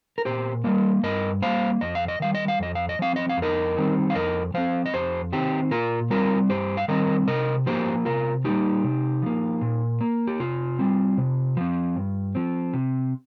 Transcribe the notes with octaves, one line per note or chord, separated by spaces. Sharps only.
A#4
A#2 G4 C5
G3 A#3 A#4 D#5
G2 A#4 D#5
G3 A#3 C5 F5
F2 D#5
F5
D#5
D#3 G3 F5
D#5
F5
F2 D#5
F5
D#5
F3 C4 F5
D#5
F5
F2
A#4 D#5
D#3 G3 C4
F5
F2 A#4 D#5
F3 C4 C5 F5
D#5
F2 G4 C5
D#3 C4 D#4 G4
A#2 F4 A#4
G3 C4 F4 A#4
G2 G4 C5
F5
D#3 G3 C4 A#4 D#5
C3 A#4 D#5
F3 A#3 G4 C5
C3 F4 A#4
G3 A#3 D#4 G4
C3
F3 A#3
A#2
A#3
G4
C3 F4
G3 C4
C3
F3 C4
G2
F3 C4
C3